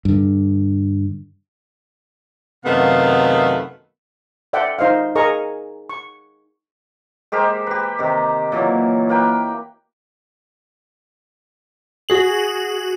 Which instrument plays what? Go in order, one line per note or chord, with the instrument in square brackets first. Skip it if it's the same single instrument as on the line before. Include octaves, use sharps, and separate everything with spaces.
[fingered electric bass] G2 D3
[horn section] F#2 C3 D#3 A3 B3 F5
[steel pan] A4 D5 E5 F#5 G5
D#4 C5 D#5 F5
G#4 A#4 D#5 A#5 C#6
C#6
[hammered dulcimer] G#3 G4 A#4 C5
G4 B4
C3 D#3
A#2 E3 F#3
A#3 B4 G5
[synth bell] F#4 G#4 F#7